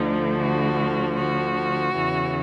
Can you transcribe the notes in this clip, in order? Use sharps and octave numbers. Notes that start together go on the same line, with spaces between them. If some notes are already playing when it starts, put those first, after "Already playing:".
Already playing: D2 D3 F3 D#4
F#4
F#4
E2 C#3 E3